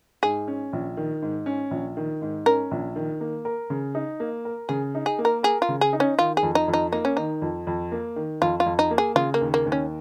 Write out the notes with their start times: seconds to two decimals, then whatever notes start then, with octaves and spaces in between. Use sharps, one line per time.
0.23 G#2 G#4
0.48 C#4
0.73 A#1
0.97 D#3
1.22 G#2
1.46 C#4
1.71 A#1
1.97 D#3
2.22 G#2
2.46 C#4 A#4
2.71 A#1
2.96 D#3
3.21 A#3
3.45 A#4
3.70 C#3
3.95 D#4
4.20 A#3
4.45 A#4
4.69 C#3 G#4
4.95 D#4
5.06 G#4
5.18 A#3
5.25 A#4
5.43 G#4 A#4
5.62 F4
5.69 C#3
5.81 G#4
5.93 D#4
6.00 C#4
6.18 D#3 F4
6.37 G#4
6.43 F2
6.55 D#4
6.68 F2
6.74 D#4
6.92 A#3 D#4
7.05 C#4
7.17 D#3 D#4
7.42 F2
7.67 F2
7.92 A#3
8.16 D#3
8.42 F2 F4
8.60 F4
8.66 F2
8.79 D#4
8.91 A#3
8.98 G#4
9.15 C#3 F4
9.34 A#3
9.41 D#2
9.54 A#3
9.66 D#2
9.72 C#4